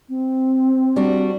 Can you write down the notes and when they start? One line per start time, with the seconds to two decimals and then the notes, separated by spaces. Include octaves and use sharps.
0.09 C4
0.96 G3 D4 F#4